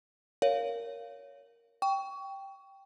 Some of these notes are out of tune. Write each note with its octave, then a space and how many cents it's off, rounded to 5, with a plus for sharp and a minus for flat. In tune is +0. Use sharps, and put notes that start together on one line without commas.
A#4 +0 C#5 +15 F5 +0
G5 +0 C#6 +25